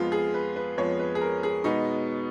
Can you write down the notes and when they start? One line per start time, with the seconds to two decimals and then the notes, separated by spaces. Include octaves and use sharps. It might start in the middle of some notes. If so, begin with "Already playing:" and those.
Already playing: F2 F3 G#3 B3 F4
0.12 G#4
0.34 B4
0.56 B4
0.77 F2 F3 G#3 B3 C#5
0.99 B4
1.15 G#4
1.21 A#4
1.43 G#4
1.64 B2 G#3 B3 D#4